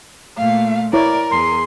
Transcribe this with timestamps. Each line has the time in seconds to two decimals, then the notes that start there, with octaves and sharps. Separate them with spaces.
0.38 A#2 A3 F5
0.93 E4 A#4 C#5 D5 D6
1.31 E2 G#4 C6